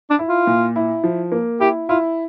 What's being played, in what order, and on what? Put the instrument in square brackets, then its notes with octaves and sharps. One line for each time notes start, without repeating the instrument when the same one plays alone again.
[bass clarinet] D4
[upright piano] E4
[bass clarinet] F4
[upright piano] A#2
E4
F3
A#3
[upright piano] E4 [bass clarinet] G4
[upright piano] E4 [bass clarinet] F4